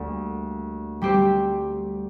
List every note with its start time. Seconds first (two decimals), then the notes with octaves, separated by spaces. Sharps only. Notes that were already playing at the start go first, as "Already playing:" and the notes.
Already playing: D2 D3 G3 A#3
1.02 G3 C4 G4 C5